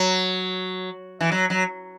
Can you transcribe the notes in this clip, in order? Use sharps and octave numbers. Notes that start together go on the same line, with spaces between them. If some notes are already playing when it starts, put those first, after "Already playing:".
Already playing: F#3
E3
F#3
F#3